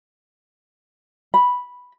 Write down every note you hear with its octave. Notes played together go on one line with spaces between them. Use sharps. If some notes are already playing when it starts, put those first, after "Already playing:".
B5